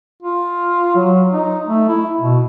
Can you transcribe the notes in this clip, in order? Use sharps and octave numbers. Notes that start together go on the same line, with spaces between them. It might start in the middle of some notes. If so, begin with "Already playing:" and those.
F4
F#3
D#4
A3
E4
B2